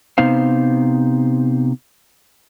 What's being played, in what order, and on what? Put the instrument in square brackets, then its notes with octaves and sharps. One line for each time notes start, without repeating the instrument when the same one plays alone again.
[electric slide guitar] C3 B3 D#4 C5 F5